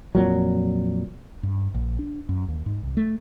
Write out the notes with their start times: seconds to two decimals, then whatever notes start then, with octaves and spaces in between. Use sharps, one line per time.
0.15 F2 A#2 F#3
1.43 G2
1.74 A#1
1.99 D4
2.29 F#2
2.48 D#2
2.66 G#2
2.83 C2
2.97 A3